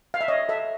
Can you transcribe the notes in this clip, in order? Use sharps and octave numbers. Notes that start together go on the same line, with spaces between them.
F5
E5
C#5 D#5
A4 E5